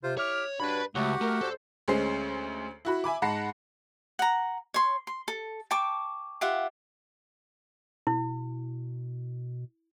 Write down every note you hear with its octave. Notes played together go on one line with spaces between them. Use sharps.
C3 F4 C5
E4 G4 C#5 E5 D6 F6
G2 G3 D4 F#4 B4 C#5 B5
C#2 F#3 A3 F#4 G4 F#5
A3 A#4
D2 A4 C5
D2 G#3 C#4 C5 C7
E4 F#4 B5
E5 G#5 B5 D6
G#2 F#5 A5 B5 A#6 C7
F#5 A#5
C#5 C6
C6
A4
G5 A5 C#6 D6
F4 G4 E5 F#5
B2 E4